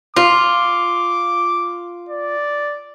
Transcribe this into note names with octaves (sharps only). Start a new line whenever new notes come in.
F4 D6
D5